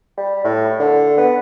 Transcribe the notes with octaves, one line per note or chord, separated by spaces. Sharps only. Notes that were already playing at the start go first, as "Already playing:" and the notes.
G3
A2
D3
B3